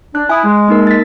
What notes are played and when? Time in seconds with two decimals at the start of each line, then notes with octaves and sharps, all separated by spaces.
0.15 D4 F#6
0.29 E4 G#5 D#6
0.45 G#3
0.68 A#3 D#4 A#4
0.87 A6 B6